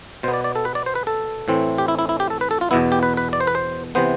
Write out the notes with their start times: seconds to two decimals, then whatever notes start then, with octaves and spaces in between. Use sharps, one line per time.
0.23 B2 C5
0.28 B3
0.34 D5
0.44 D5
0.56 A4
0.65 B4
0.75 D5
0.86 C5
0.95 B4
1.07 A4
1.48 A2 E3 A3 C4
1.78 G4
1.88 E4
1.99 E4
2.09 E4
2.20 G4
2.30 A4
2.41 B4
2.51 A4
2.61 F4
2.71 E2 B2 B3 E4
2.92 G4
3.03 B4
3.17 B4
3.33 D5
3.40 C5
3.47 B4
3.55 C5
3.95 C3 E3 B3 C5